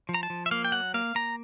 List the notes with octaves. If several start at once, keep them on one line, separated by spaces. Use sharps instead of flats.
F3
A#5
A5
F3
E5
A#3 F5
G5
F#3 F#5
A#3 F5
A#3 A#5